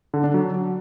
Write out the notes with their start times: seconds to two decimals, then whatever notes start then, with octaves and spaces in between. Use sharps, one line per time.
0.14 D3
0.24 D4
0.34 F#3